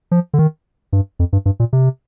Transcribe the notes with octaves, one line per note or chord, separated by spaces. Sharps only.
F3
D3
D#3
G2
F2
G2
G2
A#2
C3